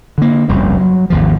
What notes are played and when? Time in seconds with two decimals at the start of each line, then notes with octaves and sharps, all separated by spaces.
0.18 D3 A#3
0.48 F1 C2 G2 C#3
0.76 F#3
1.10 G#1 D#2 F3